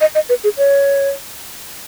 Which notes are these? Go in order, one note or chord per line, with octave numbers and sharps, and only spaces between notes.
D#5
D#5
B4
G#4
C#5